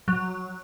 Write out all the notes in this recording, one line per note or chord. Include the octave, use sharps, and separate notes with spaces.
F#3